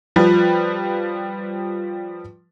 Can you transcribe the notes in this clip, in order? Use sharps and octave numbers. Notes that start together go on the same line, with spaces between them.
F3 G3 B4